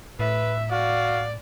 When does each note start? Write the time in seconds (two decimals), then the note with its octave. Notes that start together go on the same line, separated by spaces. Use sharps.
0.19 A2 B4 E5
0.71 F#4 D5 F5